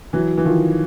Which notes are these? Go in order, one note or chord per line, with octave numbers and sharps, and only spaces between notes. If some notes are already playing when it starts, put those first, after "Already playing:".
E3 F#3
E3
D#3 F3